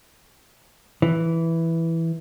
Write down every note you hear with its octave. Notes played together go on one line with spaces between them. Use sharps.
E3